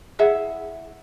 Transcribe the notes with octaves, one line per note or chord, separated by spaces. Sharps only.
E4 G#4 E5 F#5